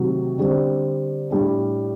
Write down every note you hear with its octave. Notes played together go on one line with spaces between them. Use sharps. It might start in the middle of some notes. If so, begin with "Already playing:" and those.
Already playing: C3 D#3 F#3 A3
D3 G3 C4
A2 G3 D4